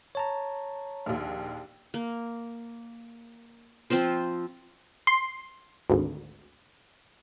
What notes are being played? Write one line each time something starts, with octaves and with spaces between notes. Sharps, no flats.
C#5 A5 A#5
A#1 D#2
A#3
F3 C4 F4 C5
C6
G#1 D2